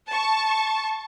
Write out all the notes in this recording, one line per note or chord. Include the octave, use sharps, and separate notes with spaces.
A5 C#6